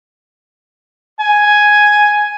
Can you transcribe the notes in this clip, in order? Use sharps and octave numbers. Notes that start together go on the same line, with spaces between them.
G#5